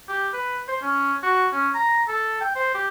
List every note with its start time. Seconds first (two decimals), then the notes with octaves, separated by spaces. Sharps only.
0.09 G4
0.33 B4
0.68 C5
0.82 C#4
1.23 F#4
1.53 C#4
1.74 A#5
2.08 A4
2.41 G5
2.56 C5
2.75 G4